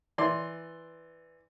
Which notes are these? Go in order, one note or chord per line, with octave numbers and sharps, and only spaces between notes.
E3 D5 C6